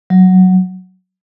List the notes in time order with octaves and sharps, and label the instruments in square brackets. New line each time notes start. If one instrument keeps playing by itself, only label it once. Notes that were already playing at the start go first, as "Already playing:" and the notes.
[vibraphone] F#3